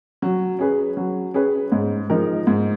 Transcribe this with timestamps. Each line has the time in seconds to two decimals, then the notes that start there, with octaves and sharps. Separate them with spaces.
0.22 F#3
0.59 C#4 G#4 B4
0.97 F#3
1.34 C#4 G#4 B4
1.72 G#2
2.10 F3 G#3 D#4 A#4
2.47 G#2